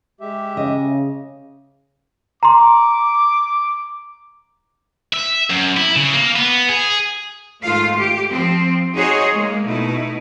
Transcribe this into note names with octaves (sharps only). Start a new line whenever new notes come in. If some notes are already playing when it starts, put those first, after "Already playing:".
G#3 G4 E5
C#3 D#5
A#5 C6 D6
E5
F#2
E4
C#3
A#3
B3
G#4
G#2 D#3 A3 F4 F5
G4
F3 C4
D#4 F#4 G#4 C5 C#5 D#5
G#3 A#3
B2 A3 D#4 E4